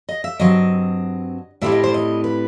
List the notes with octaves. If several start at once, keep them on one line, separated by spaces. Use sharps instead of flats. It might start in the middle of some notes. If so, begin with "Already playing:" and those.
D#5
E5
G2 F#3 C4 D#5
A2 G3 C4 E4 E5
D#5
C5
D#5
B4